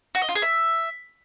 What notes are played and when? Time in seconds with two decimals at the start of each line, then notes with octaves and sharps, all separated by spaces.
0.15 F#4
0.22 D#5
0.29 F4
0.35 G#4
0.42 E5